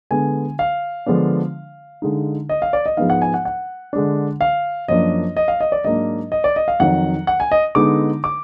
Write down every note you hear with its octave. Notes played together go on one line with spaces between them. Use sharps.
D3 G#3 B3 G#5
F5
D3 F3 G#3 B3 D4
D3 G#3 D#4
D#5
F5
D5
D#5
G#2 F3 G#3 B3 D#4 F5
F#5
G#5
F#5
F#5
D3 G#3 D4
F5
F#2 F3 A#3 D4 D#5
D#5
F5
D#5
D5
G#2 F#3 A#3 D4 D#5
D#5
D5
D#5
F5
F2 D#3 F#3 F#5
F#5
G#5
D#5
D3 G#3 B3 D#4 D6
D6